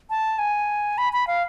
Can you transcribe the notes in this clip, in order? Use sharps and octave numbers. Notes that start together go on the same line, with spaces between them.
A5
G#5
B5
B5
F5